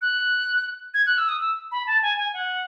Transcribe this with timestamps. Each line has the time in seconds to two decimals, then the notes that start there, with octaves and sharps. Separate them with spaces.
0.02 F#6
0.94 G#6
1.07 F#6
1.18 E6
1.29 D#6
1.40 E6
1.72 B5
1.87 A5
2.03 G#5
2.18 G#5
2.34 F#5